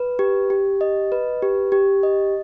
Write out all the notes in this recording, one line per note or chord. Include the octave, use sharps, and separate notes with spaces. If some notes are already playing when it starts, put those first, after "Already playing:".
Already playing: B4
G4
G4
D#5
B4
G4
G4
D#5